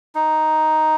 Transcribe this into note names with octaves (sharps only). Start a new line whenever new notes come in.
D#4